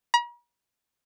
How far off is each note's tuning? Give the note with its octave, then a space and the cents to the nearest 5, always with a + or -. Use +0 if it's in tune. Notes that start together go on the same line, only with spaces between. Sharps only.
A#5 +45